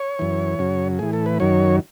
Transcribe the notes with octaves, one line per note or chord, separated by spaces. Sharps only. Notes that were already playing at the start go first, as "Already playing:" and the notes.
Already playing: C#5
F#2 E3
F#2 C#3 F#3
A2 E3 G#4
A4
B4
F#2 D#3 F#3 C#5